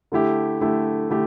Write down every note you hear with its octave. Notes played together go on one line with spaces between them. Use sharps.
D3 A3 E4 G4
D3 A3 E4 G4
D3 A3 E4 G4